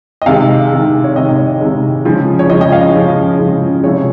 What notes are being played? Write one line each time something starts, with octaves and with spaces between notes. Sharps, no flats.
D#5
C3 D#3 G#3 F5
C3 D#3 G#3
C#5
C3 D#3 G#3 D#5
D#5
C#5
C3 D#3 G#3
C#3 F3 G#3
C#5
C#3 F3 G#3 D#5
D#5
F5
C#3 F3 G#3
C#3 F3 G#3
C3 F3 G#3 C#5